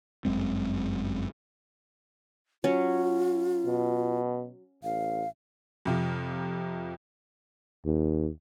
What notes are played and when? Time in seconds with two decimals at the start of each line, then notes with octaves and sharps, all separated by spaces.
0.25 G1 F#2 G#3 C4
2.64 F#3 C#4 F4
3.66 B2
4.84 A1 F5
5.85 F2 C3 F4
7.85 D#2